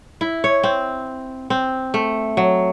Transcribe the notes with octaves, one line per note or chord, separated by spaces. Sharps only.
E4
C#5
C4
C4
A3
F#3